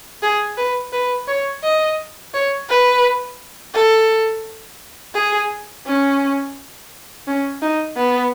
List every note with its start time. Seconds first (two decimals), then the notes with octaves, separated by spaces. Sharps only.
0.23 G#4
0.57 B4
0.92 B4
1.28 C#5
1.63 D#5
2.34 C#5
2.69 B4
3.74 A4
5.15 G#4
5.86 C#4
7.27 C#4
7.62 D#4
7.97 B3